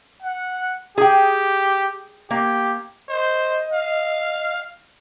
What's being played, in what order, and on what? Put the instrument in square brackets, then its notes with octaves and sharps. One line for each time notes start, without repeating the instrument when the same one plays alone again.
[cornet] F#5
[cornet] G4 [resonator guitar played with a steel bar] G#4 G5
[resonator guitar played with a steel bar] A#3 [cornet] G4
[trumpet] C5 [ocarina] D#5
[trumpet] F5